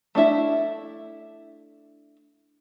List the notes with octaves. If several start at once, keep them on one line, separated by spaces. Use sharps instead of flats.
A3 D4 E4 E5